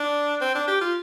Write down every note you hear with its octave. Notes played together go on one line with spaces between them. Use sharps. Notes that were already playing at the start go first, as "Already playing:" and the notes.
Already playing: D4
C4
D4
G4
F4